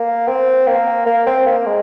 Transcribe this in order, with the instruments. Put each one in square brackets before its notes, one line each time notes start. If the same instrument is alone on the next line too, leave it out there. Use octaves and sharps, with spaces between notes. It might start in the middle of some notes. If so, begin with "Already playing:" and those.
Already playing: [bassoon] A#3
C4
A#3
A#3
C4
A#3
G#3